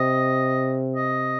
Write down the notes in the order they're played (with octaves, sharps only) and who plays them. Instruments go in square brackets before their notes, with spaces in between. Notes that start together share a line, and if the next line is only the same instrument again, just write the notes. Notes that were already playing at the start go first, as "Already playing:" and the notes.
Already playing: [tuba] C3 [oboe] D#5
[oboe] D#5